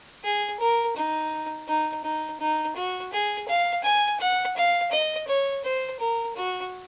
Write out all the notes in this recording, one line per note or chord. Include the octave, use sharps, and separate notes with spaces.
G#4
A#4
D#4
D#4
D#4
D#4
F#4
G#4
F5
G#5
F#5
F5
D#5
C#5
C5
A#4
F#4